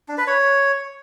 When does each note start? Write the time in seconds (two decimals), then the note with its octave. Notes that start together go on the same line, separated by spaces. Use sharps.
0.08 D4
0.18 B4
0.27 C#5